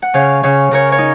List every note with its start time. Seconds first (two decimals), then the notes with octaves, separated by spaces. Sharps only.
0.02 F#5
0.14 C#3 C#5 F5
0.43 C#3 C#5 F5
0.71 C#3 A#4 C#5
0.92 C#5
0.98 D#4